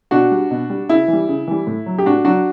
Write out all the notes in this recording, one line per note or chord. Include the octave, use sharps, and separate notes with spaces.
B2 D4 F#4
G3
B2
G3
C#3 E4
E3
G3
C#3
E3 G3
A2
F#3
G4
A2 D4 F#4
F#3 D4 F#4